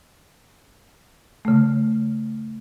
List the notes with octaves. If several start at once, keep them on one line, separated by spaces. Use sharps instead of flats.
C#3 A3